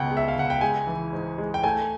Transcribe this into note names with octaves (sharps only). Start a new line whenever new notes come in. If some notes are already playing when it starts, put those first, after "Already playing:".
Already playing: C#2 B2 F#5 G5
G#3
E5
F5
C#2 F#5
G5
G#3 G#5
E3
G#2
G#3
G5
A3 G#5